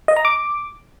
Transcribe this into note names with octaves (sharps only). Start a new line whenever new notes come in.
D#5
A#5
D6